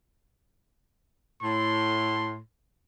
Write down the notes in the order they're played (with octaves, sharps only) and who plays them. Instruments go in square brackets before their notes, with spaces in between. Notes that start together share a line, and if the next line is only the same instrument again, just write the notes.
[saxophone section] A2 [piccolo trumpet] C6